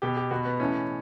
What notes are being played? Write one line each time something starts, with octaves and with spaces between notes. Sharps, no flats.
B2 G4
G4
B2 F#4
B3
A2 E3 C#4